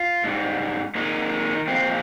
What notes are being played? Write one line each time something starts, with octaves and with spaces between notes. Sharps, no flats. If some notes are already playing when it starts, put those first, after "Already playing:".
Already playing: F4
G#2 G3
A#2 D#3 G#3 D#4
A#2 F3 G#3 C4